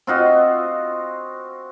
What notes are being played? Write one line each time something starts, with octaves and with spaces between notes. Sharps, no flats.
C4 F4 F#4 D#5